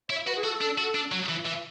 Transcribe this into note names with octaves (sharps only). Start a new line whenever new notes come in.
E4 C#5
F#4 B4
G#4
F#4 A4
D4
F#4
D4
F#3
E3
E3